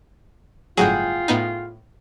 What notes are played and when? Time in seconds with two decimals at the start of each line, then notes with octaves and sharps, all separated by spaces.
0.77 G1 A2 F#3 F4 G#4 F#5 G5
1.28 A2 B3 D#4